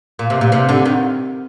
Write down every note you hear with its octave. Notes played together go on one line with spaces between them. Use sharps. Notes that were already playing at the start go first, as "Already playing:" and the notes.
A#2
C3
A#2
C3
D3
D#3